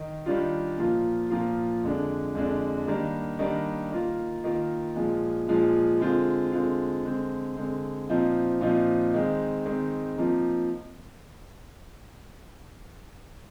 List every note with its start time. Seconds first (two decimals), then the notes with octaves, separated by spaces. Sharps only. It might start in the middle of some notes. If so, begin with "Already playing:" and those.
Already playing: D#3
0.26 D#3 G3 D4 F4
0.78 A#2 F3 A#3 F4
1.30 A#2 F3 A#3 F4
1.83 F2 D3 G#3 D4
2.35 F2 D3 G#3 D4
2.87 D#3 G3 A#3 D4
3.39 D#3 G3 A#3 D4
3.92 D#3 A#3 F4
4.44 D#3 A#3 F4
4.96 A#2 F3 G#3
5.49 A#2 F3 G#3
6.00 D3 G#3 C4 F4
6.52 D3 G#3 C4 F4
7.05 D3 G#3 C4
7.57 D3 G#3 C4
8.09 A#2 F3 C4 D#4
8.61 A#2 F3 C4 D#4
9.14 D#3 G#3 C4 D#4
9.66 D#3 G#3 C4 D#4
10.18 C3 F3 A#3 D#4